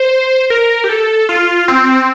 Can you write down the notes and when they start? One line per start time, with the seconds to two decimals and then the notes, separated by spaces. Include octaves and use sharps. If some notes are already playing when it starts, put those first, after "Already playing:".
Already playing: C5
0.50 A#4
0.84 G4
0.89 A4
1.29 F4
1.68 C4